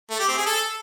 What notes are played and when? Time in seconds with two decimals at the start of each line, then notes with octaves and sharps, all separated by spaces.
0.10 A3
0.19 G4
0.28 C4
0.37 G#4
0.46 A4